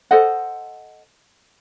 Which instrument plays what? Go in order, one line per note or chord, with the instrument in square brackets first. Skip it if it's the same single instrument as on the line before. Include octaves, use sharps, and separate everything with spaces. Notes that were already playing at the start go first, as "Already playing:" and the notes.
[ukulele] A4 C5 D#5 F#5